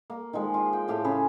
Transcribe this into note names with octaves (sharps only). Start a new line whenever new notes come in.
A#3
D#3 F3 G#3
F4
G5
A2 G4 F5 A5
C#3 G#4 B5